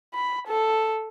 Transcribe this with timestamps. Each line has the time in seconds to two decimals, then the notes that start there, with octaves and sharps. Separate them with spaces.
0.14 B5
0.48 A4